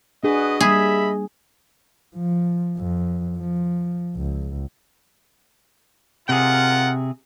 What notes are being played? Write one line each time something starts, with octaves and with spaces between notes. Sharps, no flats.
D4 F#4 G#4 B4 D#5
G3 A#3 G#4 D#5 E5 B5
F3
F2
F3
C#2
C3 F4 G#4 A#4 F#5